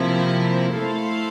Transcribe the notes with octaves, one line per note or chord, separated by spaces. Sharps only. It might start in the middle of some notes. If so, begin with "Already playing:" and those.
Already playing: C3 F3 A#3 E4
A3 E4 A4 C5 F5